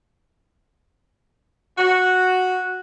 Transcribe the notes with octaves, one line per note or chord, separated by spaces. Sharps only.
F#4